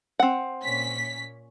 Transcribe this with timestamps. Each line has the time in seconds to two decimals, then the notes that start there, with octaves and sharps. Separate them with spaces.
0.19 C4 F#5
0.63 A#2 C#4 B6